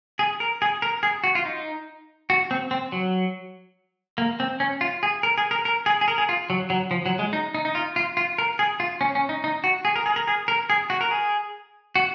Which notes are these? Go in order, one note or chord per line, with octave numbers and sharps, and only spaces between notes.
G#4
A#4
G#4
A#4
G#4
F#4
F4
D#4
F#4
C4
C4
F#3
A#3
C4
C#4
F4
G#4
A#4
G#4
A#4
A#4
G#4
G#4
A#4
G#4
F4
F#3
F#3
F3
F#3
G#3
D#4
D#4
D#4
F4
F4
F4
A#4
G#4
F4
C#4
C#4
D#4
D#4
F#4
G#4
A#4
G#4
A#4
G#4
A#4
G#4
F#4
A#4
G#4
F#4